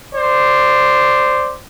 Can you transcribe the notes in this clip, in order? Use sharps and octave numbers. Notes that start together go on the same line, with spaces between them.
C5 D5